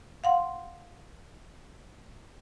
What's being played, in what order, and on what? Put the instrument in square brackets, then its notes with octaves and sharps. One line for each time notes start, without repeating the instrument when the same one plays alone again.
[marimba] F5 F#5 C6